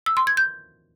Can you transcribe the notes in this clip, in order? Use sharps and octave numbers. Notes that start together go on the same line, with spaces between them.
E6
C6
G#6
G6